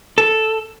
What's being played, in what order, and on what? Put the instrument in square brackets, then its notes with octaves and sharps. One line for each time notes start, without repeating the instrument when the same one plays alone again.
[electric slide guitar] A4